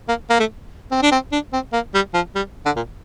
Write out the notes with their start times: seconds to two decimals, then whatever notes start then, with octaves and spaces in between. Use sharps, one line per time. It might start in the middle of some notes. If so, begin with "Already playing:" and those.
0.09 A#3
0.30 A#3
0.40 A3
0.91 C4
1.02 D4
1.12 C4
1.32 D4
1.53 C4
1.73 A#3
1.94 G3
2.14 F3
2.35 G3
2.65 D3
2.76 A#2